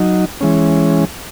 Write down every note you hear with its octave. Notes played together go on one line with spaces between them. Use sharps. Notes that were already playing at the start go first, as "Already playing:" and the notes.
Already playing: F#3 D#4
E3 G#3 C#4